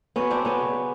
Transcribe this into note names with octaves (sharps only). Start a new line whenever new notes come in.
F#3 B3 C#4
F#3 C4 D4
F#3 B3 C#4
C#3
C#3